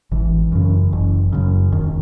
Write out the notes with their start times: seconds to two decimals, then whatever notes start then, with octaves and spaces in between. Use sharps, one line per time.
0.11 G#1 E3
0.52 F#2 C#3
0.93 F#1
1.32 F#2 C#3
1.72 E1 D#3